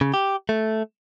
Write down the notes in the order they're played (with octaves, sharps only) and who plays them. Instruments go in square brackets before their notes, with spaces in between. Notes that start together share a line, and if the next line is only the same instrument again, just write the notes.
[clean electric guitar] C#3
G4
A3